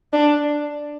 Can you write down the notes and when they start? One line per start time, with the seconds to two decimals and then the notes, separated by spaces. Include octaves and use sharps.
0.13 D4